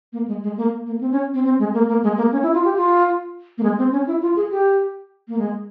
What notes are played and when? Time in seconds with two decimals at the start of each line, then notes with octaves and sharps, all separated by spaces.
0.13 A#3
0.28 G#3
0.43 G#3
0.57 A#3
0.86 A#3
1.01 C4
1.12 C#4
1.34 C4
1.45 C4
1.59 G#3
1.74 A#3
1.88 A#3
2.03 G#3
2.17 A#3
2.32 C#4
2.43 E4
2.54 F4
2.65 G4
2.76 F4
3.58 A#3
3.63 G#3
3.78 C4
3.92 C#4
4.07 E4
4.22 F4
4.36 G#4
4.51 G4
5.28 A#3
5.38 G#3